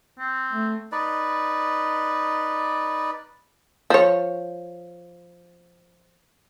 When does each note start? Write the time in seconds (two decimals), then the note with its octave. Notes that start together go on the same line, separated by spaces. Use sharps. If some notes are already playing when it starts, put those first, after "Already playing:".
0.19 C4
0.53 A3
0.92 D#4 B4 D5
3.90 F3 C#5